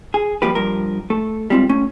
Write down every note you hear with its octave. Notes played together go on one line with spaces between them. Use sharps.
G#4
F3 G3 A#3 G4 B4
G2 F3 A#4
A3 A4
G3 G#3 C4 D#4 F4
A3 C#4